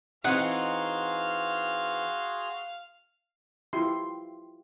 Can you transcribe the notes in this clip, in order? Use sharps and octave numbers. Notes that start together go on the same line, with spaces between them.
E3 C4 D#4 F#4 G#4 F5 F#5 C6
E4 F4 G4 C6